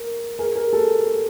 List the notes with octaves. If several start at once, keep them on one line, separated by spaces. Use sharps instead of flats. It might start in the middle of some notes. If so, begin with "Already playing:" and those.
Already playing: A#4
G#4 A#4
G#4 A#4
G4 A4